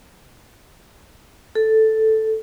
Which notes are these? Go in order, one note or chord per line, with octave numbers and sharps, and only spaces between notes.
A4